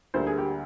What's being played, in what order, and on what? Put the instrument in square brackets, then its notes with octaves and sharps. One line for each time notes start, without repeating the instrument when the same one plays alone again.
[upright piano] D2 D3 G3 A#3 C5
G#4
G4